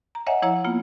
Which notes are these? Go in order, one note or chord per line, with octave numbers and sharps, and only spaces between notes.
A#5
C#5 D#5 E5 F#5 G#5 A#5
F3 E4 C#5 F#5 A#5
A#3 B3 F4